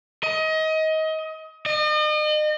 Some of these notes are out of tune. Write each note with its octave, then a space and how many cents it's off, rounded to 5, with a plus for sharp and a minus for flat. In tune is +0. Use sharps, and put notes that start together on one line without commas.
D#5 +25
D#5 -40